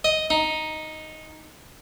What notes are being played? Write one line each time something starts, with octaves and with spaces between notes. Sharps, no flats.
D#5
D#4